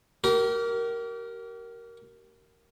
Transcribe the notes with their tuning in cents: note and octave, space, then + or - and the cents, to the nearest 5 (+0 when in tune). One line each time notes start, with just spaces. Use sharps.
G4 -40 A#4 +0